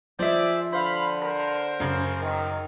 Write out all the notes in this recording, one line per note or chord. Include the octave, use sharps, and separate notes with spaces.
F3 G#4 C5 D5 E5
D3 C5 F5 B5
A#4 C5 B5
F#2 C#3
D#3